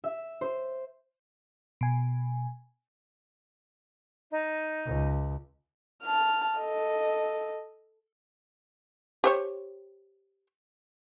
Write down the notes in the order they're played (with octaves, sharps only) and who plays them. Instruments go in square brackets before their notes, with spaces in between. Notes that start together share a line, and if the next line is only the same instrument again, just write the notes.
[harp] E5
C5
[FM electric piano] B2 G#5
[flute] D#4
[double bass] C#2
[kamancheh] A5 F6
A4 D#5
[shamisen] G4 C5 C#5